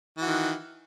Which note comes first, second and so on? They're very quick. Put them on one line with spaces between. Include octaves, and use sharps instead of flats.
E3 F#4 D#3